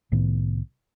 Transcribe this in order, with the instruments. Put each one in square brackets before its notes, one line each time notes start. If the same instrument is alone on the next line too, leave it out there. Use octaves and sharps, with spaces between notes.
[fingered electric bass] C2 A2 D#3 B3